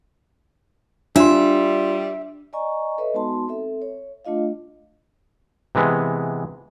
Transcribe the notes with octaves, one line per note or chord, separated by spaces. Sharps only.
G3 D4 F4 E5 C6
D5 D#5 G#5 A#5 C#6
A4 B4 C#5 D#5 E5
G#3 B3 D#4 F#4 A5 C6
C4 A4 E5
C#5
A3 D4 F4 D#5 F5
C3 E3 G#3 B3